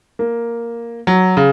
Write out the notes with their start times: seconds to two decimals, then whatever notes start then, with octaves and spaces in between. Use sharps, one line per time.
0.19 A#3
1.07 F#3
1.37 C#3